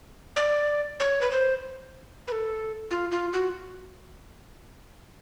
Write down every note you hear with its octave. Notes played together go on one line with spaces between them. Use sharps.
D5
C#5
B4
C5
B4
A4
F4
F4
F#4